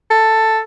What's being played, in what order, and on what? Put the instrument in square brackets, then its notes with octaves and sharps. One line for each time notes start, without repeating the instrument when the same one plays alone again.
[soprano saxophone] A4